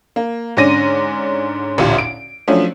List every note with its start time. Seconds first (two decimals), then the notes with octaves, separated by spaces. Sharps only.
0.16 A#3
0.57 G#2 D3 C#4 D5 A#6 D#7
1.78 A1 D2 A#2 G4
1.98 D7
2.48 F3 F#3 A3 C#4 D4